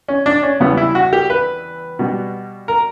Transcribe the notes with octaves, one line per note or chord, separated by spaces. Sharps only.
C#4
D4
C#4
E2 C#3 E3 G3 B3
E4
F#4
G4
B4
B2 G3
A#4